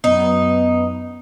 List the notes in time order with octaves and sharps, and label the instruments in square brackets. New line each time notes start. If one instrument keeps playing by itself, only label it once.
[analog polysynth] F#2 B3 [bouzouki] D#4